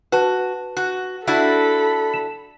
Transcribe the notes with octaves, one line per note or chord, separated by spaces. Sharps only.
F#4 B4 A5
F#4
D4 E4 F#4 A4 B5
E7